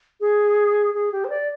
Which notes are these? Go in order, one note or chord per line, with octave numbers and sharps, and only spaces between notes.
G#4
G#4
G4
C5
D5